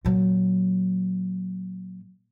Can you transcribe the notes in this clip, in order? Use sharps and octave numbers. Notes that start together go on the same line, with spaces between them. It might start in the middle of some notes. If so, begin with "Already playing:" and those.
A#2 F#3